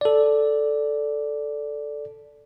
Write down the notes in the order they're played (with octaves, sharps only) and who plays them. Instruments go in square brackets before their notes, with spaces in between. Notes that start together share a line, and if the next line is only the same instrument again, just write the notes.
[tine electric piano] A4 D5